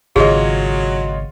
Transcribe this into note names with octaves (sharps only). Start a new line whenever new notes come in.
G#1 C#3 F#3 F4 G#4 C#5 D#5